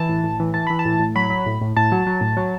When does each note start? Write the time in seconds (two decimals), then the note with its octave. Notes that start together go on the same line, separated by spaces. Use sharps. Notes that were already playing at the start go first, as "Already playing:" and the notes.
Already playing: E3 A5
0.09 A2
0.24 A2
0.40 E3
0.54 E3 A5
0.67 E3 B5
0.79 A5
0.85 A2
0.99 A2
1.15 F#3 B5
1.30 F#3
1.46 A2
1.61 A2
1.76 A2 A5
1.92 F#3
2.07 F#3
2.21 A2
2.37 F#3